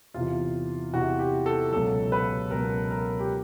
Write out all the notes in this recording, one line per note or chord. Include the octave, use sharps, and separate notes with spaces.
E2 C3 E3 F4
E2 C3 E3 F#4
G4
A4
C#2 B2 F#3 A4
B4
C#2 B2 F#3 A#4
A#4
G4